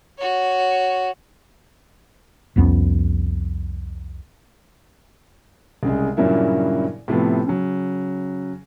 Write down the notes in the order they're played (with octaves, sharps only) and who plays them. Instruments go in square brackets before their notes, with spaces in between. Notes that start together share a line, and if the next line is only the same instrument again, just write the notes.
[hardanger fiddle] F#4 C#5
[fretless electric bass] C2 F2 B3 C#4
[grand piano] C2 C#3 G#3
G2 A#2 C#3 F#3 A#3 E4
A2 C3 F3 A3 B3
C#3 F#3